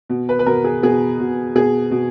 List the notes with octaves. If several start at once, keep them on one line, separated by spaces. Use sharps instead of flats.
B2
B4
B4
B2 A#4
G#4
B2 G#4
B2
B2 G#4
B2